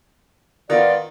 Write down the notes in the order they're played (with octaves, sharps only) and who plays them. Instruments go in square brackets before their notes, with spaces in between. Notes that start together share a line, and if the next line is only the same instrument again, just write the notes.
[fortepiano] D#3 [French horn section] B3 F4 [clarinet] D5